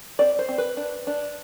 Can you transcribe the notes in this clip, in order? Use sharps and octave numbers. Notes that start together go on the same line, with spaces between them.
C4 D5
C5
C4
B4
D4
D4